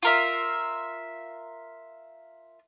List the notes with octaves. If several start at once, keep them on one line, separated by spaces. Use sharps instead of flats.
F4 A#4 E5